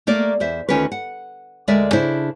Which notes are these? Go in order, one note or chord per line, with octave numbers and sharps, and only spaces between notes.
A3 A#3 A#4 D5
E2 C5 E5
D2 D#3 C#4 F4 A#4 B4
F#5
D2 G#3 A#4 D5 E5
C#3 D4 E4 C5